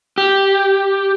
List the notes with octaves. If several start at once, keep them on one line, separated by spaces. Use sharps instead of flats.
G4